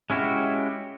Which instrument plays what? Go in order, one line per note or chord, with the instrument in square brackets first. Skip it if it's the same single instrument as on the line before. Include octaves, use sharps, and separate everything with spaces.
[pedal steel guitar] G#3 C#4 E4 F#4 G4